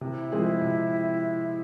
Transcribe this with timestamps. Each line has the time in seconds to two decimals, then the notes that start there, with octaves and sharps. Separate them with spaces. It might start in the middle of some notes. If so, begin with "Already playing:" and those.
0.01 C3 E4
0.32 F3 G#3 C4 G#4
0.62 C3